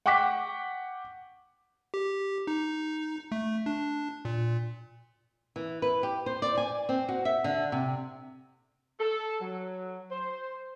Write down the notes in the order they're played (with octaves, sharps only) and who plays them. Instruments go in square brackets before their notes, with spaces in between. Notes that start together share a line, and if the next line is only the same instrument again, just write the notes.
[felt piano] F#5 G5 C#6 D6 F#6 B6
[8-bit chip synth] G4
D#4
A3
D4
A#2
[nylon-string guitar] E3
B4
G4
C5
D5
G#5
C4
F#4
E5
D3
C3
[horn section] A4
F#3
C5